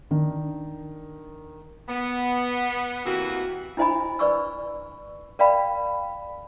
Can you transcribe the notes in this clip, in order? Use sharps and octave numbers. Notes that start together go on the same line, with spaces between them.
D#3 D4
B3
C3 E3 A#3 F#4
D4 E4 C5 D#5 G#5 B5
B4 D5 C#6 E6
A#4 D5 F5 G5 B5